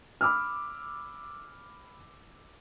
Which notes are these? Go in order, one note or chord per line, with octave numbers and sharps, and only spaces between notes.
B5 D6 E6 F6